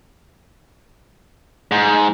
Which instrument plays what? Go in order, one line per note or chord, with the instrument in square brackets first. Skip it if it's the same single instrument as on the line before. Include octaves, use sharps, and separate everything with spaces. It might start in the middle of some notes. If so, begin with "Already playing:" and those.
[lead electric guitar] G#2